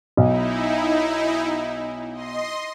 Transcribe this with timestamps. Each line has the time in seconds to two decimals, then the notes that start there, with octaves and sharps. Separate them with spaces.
0.17 B1 D#4 E4
2.12 D#5 C6